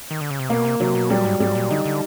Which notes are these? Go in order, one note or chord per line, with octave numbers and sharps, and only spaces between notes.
D#3
D3
C#3
C3
B2 A#3
C3
C3 F#3
B2
A#2 G3
G#2
G#2 G3
A#2
D3 D#4
D3